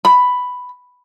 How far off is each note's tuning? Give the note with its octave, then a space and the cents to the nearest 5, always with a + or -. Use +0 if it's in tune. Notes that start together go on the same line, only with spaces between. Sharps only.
B5 +5